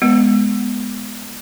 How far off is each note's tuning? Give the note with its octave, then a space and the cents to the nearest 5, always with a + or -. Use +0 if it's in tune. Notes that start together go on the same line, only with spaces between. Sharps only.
G#3 +0 B3 +0